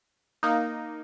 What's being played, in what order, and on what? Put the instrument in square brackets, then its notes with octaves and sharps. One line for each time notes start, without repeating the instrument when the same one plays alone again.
[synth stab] A#3 D#4